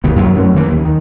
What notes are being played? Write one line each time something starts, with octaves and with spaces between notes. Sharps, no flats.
D#2 B2 D#3 A#3
F#2 F#3
F#2 F#3 A3 C#4
D#3 E3 A#3
D#2
D#3